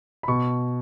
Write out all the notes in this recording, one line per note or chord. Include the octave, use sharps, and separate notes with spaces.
B5
B2 C#6